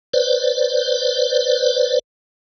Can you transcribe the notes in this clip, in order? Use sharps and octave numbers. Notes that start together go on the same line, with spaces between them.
B4 C5 D5